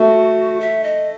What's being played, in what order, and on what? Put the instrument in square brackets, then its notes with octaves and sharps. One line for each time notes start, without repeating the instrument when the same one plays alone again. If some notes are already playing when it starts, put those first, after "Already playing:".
Already playing: [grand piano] A3 [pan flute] F#4
[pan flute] E5
D#5